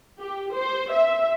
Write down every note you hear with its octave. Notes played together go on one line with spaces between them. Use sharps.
G4
C5
E5